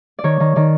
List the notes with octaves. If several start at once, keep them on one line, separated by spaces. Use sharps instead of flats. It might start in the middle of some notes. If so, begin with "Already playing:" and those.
D5
D#3 C#5
D#3
D#3 D5